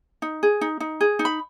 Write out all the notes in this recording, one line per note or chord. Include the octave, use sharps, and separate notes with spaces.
D#4
G#4
D#4
D#4
G#4
D#4
B5